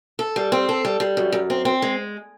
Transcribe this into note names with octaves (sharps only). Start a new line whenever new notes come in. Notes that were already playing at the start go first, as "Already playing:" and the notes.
A4
G3
C4
A4
G3
G3
F#2
F#2
C4
C4
G#3